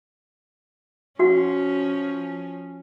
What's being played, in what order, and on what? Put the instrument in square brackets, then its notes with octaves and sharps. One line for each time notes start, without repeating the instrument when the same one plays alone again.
[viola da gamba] F3 C#4 [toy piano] F#4 F#5